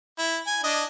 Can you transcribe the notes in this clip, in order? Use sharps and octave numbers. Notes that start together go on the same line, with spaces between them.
E4
G#5
D4 D#5